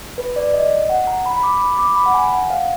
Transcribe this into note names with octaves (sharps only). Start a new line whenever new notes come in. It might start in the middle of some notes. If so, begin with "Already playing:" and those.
B4
D5
D#5
F#5
A#5
B5
B5
D6
B5
D6
B5
F#5
G#5
F#5
F5